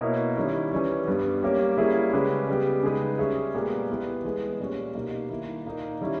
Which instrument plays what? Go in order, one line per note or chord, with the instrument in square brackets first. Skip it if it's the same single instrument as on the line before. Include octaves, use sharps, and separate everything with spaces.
[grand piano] B2 A#3 E4 A#4 C#5
D#3 G3 C#4 E4
E3 G3 C#4
G2 G3 B3
G3 A#3 C#4 G4 C#5
G3 A#3 C#4 E4 G#4
C#3 G#3 C#4 G4 B4
C#3 G3 B3 G4
C#3 G#3 D#4 G#4 B4
G3 C#4 G#4 C#5 E5
A#2 G#3 B3 G4 A#4
G3 B3 E4
E3 G#3 B3
A#2 G3 C#4
B2 G3 A#3 D#4
D#3 A#3 E4
A#2 A#3 D#4 A#4
D#3 G3 C#4 E4